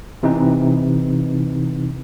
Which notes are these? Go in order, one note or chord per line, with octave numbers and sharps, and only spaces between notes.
C3 E3 C4 D#4 B4